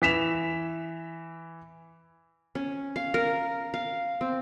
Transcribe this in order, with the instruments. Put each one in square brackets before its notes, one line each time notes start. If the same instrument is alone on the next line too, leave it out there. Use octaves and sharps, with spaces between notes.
[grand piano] E3 B6 E7 F7
[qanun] C#4
F5
A#4
F5
C4